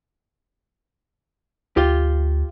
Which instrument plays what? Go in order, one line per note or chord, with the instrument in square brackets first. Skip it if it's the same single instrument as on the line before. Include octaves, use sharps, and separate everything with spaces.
[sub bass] D2 [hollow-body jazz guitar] F4 G4